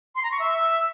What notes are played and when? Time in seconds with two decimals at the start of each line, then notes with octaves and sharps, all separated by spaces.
0.15 C6
0.23 A#5
0.31 C#6
0.39 E5